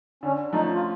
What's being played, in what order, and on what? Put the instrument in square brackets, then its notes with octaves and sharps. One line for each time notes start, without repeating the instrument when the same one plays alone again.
[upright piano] D3 [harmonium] C#4
[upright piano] F3 A3 C#4 [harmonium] D#4
[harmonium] F4